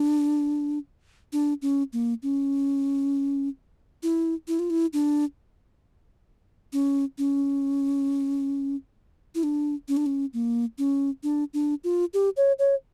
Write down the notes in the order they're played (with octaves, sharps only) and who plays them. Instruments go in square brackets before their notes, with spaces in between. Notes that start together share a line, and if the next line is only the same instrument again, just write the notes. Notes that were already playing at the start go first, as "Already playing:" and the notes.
Already playing: [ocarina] D4
D4
C#4
A#3
C#4
E4
E4
F4
E4
D4
C#4
C#4
E4
D4
C#4
D4
C#4
A#3
C#4
D4
D4
F4
G4
C#5
C#5